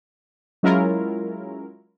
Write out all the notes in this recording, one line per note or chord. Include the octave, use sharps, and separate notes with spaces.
F#3 G#3 C#4 E4 F4 A#4